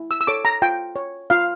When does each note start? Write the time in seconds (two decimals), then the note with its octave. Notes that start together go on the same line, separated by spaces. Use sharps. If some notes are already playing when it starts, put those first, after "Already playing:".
Already playing: E4
0.11 E6
0.21 E6
0.27 A4 C#5 D6
0.45 A#5
0.62 F4 G5
0.96 C#5
1.30 F4 F5